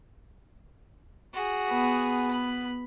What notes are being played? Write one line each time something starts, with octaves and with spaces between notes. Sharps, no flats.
F#4 G#4
B3
B5